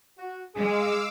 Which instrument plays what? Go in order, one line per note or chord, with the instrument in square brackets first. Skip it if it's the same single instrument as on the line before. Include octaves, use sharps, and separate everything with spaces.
[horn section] F#4
[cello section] G#3 [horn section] G#4 [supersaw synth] F5 D6 E6